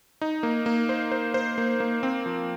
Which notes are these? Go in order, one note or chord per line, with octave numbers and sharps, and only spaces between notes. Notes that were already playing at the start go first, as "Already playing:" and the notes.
D#4
A#3
A#3
C5
C5
C5
A#3
A#3
C4
F3